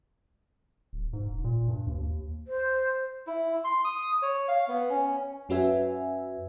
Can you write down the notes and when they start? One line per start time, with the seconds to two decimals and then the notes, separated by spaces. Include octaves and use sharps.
0.93 D1
1.13 G#2
1.30 E1
1.44 A#2
1.68 G2
1.87 D#2
2.01 D#2
2.47 C5
3.27 E4
3.64 C6
3.85 D#6
4.22 C#5
4.48 F5
4.68 B3
4.90 C#4
5.49 F#2 C#4 F#4 B4 E5 G#5